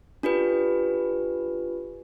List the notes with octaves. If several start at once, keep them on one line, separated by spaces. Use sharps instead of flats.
D4 F4 G4 B4